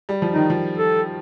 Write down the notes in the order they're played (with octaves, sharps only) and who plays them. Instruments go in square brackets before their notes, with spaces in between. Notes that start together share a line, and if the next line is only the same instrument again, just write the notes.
[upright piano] G3
F3
[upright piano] D#3 [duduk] D#4
[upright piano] F3
[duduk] A4